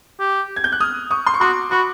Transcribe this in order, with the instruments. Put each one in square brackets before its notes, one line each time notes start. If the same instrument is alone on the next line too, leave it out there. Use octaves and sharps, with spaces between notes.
[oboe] G4
[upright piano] G#6
G6
F#6
D#6 F6
C#6 D#6
C6
C#6
[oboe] F#4 [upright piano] C6 D6
[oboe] F#4 [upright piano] B5 C#6